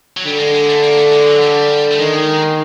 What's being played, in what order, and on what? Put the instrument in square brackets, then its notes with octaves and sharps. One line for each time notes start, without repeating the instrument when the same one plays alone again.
[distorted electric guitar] F#3
[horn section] D3 [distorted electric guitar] G3
[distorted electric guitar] G#3
G#3
A3
A#3
A3
G#3
F#3
G3
A3
[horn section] D#3 [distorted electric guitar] G#3